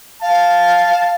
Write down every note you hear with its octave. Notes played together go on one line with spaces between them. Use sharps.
F5 A5